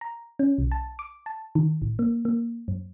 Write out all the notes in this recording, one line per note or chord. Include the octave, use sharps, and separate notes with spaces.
A#5
C#4
B1
A5
D6
A5
D#3
A1
A#3
A#3
F#2